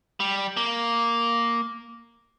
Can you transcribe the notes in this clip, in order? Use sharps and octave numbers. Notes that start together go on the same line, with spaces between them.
G3
A#3